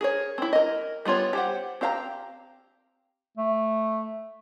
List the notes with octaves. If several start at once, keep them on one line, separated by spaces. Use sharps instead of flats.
G#4 A#4 C#5
C4 E4
A#4 D#5
G3 B3 F4 C#5
G4 C5 F#5
C4 G4 F5 G5 A#5
A3